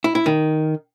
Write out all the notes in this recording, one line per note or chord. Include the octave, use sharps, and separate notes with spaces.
E4
E4
D#3